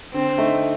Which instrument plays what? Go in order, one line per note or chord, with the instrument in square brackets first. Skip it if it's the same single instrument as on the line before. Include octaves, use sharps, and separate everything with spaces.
[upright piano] D3 [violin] C4
[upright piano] A3 D#4